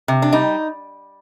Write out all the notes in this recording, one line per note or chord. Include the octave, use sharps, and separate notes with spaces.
C3
D4
G3 D#4